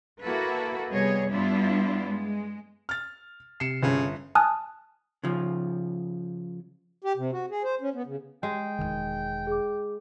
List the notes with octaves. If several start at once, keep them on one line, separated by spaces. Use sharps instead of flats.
A#3 E4 F#4 A4 B4
C3 G3 B3 G#4 C#5 D#5
G2 G3 B3 D4 E4 F4
G#3
F6 A6
C3 C7 C#7 E7
G1 C#3
G#5 A5 D#6 F6 F#6
C#3 F3
G4
C3
F#4
G#4
C5
C#4
B3
C#3
G#3 G5
E1 C2 D#3
G#4 D6